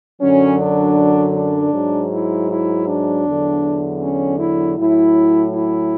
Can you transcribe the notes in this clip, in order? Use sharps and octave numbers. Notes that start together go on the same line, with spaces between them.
F#2 D3 F#3 C#4
D4
D4
G#2 F#3
E4
E4
D4
E2 D3 F#3
C#4
E4
A2 F#3 E4
E4